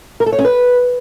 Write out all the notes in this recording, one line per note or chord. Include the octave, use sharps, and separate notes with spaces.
A#4
A4
C#5
C#4
B4